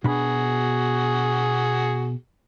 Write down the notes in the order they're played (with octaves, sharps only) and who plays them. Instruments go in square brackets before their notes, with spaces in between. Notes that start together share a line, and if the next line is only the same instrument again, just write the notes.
[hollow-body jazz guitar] B2 D4 B5 [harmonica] F#4 G#4